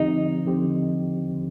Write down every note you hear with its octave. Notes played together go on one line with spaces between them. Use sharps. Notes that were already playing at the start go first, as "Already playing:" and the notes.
Already playing: D3 F3 C4 D#4 G4
D3 F3 C4 G4
D3